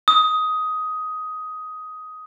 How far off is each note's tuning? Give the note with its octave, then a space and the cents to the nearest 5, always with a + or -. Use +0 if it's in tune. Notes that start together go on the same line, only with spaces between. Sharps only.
D#6 +10